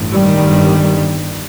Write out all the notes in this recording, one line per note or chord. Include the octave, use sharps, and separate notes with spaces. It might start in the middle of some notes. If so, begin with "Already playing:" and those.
Already playing: A1 G2
D#3 G3
G1 G2